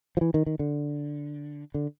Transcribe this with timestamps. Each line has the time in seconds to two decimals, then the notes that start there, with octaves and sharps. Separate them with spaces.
0.17 F3
0.21 E3
0.34 D#3
0.46 D#3
0.59 D3
1.74 D3